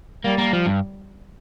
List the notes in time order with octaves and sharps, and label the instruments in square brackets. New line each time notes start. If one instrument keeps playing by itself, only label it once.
[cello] G3 [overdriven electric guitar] A#3
[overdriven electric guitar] A#3
F3
G2